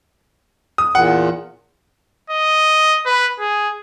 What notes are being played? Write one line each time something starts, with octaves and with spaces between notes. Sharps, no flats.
D#6
E2 A#2 F#5
D#5
B4
G#4